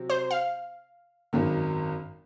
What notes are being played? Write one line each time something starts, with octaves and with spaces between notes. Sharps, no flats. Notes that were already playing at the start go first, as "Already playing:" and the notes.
Already playing: C3 F#3 C4
C5
F5
G#1 F#2 D#3